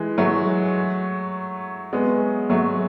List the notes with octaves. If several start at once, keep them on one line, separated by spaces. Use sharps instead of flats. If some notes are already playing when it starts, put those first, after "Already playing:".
Already playing: E3 G#3
F#3 A3
G#3 B3
F#3 A3